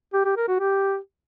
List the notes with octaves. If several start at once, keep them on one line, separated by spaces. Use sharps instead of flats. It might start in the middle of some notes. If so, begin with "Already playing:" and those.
G4
G4
A#4
F#4
G4